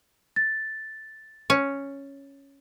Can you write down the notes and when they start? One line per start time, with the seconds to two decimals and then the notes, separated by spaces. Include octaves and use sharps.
0.36 A6
1.50 C#4